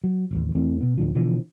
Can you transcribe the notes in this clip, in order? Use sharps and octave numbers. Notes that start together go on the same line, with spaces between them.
F#3
E1 A1 D#2
E2 E3 A3 C4
B2 B3
D2 A2 D3 F3
B2 D3 E3 F3